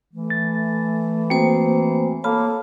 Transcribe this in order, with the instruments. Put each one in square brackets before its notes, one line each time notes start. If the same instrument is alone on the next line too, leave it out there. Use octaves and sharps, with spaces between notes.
[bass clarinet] E3 [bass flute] A3
[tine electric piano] A6
[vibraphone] A#3 C5 [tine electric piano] C4 F#4 G5
[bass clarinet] A#3 [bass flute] A4 [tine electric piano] C#5 B5 F6 [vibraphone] A5